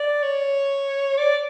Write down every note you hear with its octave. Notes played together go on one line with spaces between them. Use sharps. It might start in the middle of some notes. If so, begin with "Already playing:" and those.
Already playing: D5
C#5
D5